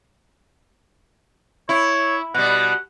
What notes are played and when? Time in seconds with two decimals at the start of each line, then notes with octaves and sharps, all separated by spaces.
1.69 E4 C#5
2.34 B2 G3 F#5